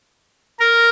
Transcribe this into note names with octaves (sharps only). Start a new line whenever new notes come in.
A#4